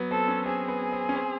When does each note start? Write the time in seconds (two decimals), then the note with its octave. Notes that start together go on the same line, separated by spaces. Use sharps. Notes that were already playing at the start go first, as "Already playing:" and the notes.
Already playing: F#3 B3
0.11 C4 A4
0.28 C#4
0.46 C4 G#4
0.68 B3
0.92 C4
1.09 C#4
1.16 C4